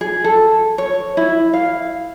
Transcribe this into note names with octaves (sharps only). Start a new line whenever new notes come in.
G#4
A4
C#5
E4
F5